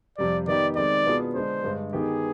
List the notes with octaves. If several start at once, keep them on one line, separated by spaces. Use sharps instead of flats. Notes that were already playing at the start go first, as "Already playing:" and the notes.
F2 C3 G3 D5
D#3 B3 D#4 G4 D5
D#3 G#3 C4 D5
B2 B3 D4 F4 G#4
D3 G#3 D4 C5
G2 D3 G#3
D#3 B3 D#4 G4 G#4